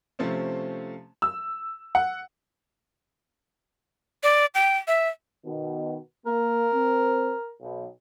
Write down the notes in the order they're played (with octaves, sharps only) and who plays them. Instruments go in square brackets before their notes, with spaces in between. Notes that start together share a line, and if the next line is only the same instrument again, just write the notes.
[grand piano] C3 F3 A3 C4 C#4
[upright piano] E6
F#5
[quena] D5
G5
E5
[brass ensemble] B2 D#3
[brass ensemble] A#3 [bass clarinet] A#4
[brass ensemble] C4
B1